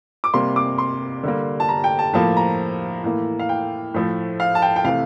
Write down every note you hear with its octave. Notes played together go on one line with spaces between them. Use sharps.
D6
C3 G3 A#3 C6
D6
C6
D3 G3 A#3
A5
A#5
G5
A5
A2 F3 A#3 A5
A#5
A2 E3 A#3
F5
G5
A2 F3 A3
F5
A5
G5
G5
C3 E3 A3 F5